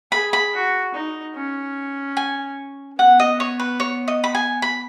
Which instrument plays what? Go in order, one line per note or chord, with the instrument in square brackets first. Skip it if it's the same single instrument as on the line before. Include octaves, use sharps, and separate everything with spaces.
[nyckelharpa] G#4 [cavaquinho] B5
[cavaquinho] B5
[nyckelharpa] F#4
D#4
C#4
[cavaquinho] G#5
[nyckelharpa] B3 [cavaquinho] F#5
[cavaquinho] D#5
C#5
B4
C#5
D#5
B5
G#5
B5